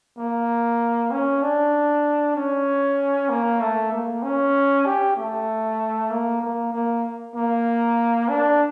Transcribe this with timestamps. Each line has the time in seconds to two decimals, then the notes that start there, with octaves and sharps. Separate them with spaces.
0.18 A#3
1.11 C#4
1.42 D4
2.36 C#4
3.29 A#3
3.60 A3
3.92 A#3
4.23 C#4
4.86 G4
5.16 A3
6.10 A#3
6.41 A#3
6.73 A#3
7.36 A#3
8.29 D4